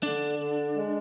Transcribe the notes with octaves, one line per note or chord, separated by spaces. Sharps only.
D3 D4
D3
G#3